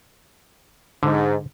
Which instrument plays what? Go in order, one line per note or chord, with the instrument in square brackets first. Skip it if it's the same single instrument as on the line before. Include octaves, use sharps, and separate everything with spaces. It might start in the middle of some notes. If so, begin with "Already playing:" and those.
[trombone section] G#2 [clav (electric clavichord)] D3